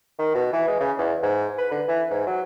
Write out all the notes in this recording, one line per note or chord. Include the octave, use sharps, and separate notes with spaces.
D#3
B2
E3
G#3
C#3
E2
G#2
B4
D3
E3
G#2
F#3